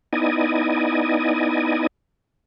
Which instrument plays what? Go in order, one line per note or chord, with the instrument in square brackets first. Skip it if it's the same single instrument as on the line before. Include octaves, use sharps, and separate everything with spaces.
[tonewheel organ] B3 D#4 E4 D5 D#5 G#5